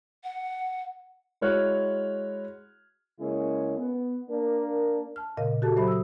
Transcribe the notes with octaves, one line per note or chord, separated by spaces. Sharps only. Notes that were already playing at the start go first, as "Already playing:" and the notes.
F#5
G#3 E4 F#4 C#5 F6 F#6
C#3 G#3 A#3 C#4 E4 G#4
B3
A#3 D4
A5 F6
A#2 C#3 A#4 D#5 F5
F#4 G4 A4 A5
F#3 C5 E5 B5
D#6 E6